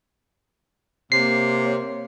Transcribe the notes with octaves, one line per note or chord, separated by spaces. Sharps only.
C3 A#3 C#5 C7